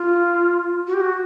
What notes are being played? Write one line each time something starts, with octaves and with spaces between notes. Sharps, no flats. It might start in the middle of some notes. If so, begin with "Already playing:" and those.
Already playing: F4
F#4
G4
F#4